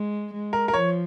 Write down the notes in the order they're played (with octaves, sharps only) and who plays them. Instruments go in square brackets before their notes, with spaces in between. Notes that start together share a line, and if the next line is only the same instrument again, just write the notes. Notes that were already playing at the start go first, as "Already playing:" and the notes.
Already playing: [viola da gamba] G#3
G#3
[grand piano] A#4
A#4
[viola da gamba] F3 [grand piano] C#5